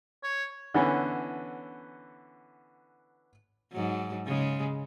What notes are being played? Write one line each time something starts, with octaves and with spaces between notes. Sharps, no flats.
C#5
D3 E3 B3 C#4
G#2 F#3
C#3 G#3